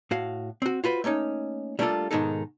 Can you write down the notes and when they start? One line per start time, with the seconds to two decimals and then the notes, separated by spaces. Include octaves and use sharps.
0.11 A2 F#4 F5
0.62 C4 F#4
0.84 F4 F#4 B4 C5
1.04 A3 A#3 C#4 D#4
1.79 G3 A3 A#3 D4 F4 A4
2.11 G#2 B2 D#3 G#3 D#4 A4